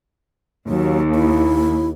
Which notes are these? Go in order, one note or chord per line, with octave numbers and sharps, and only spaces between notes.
D#2 F#3
E4